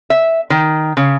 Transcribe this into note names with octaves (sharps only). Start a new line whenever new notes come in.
E5
D#3
C#3